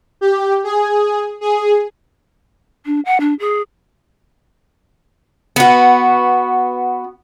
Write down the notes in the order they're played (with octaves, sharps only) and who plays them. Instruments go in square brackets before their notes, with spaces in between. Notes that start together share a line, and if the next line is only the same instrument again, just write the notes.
[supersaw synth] G4
G#4
G#4
[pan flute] D4
F#5
D4
G#4
[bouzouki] B3 F#4